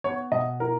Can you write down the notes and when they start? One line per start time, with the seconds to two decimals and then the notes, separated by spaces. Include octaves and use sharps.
0.04 B3 C#5
0.32 B2 D#5
0.60 E4 A#4